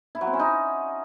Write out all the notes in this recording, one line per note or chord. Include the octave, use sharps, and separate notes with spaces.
E4
F#3
C4
C#4
D#4